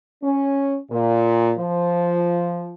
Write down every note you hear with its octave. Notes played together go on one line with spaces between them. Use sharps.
C#4
A#2
F3